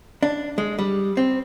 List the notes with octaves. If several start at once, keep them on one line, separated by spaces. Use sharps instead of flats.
D4
G#3
G3
C4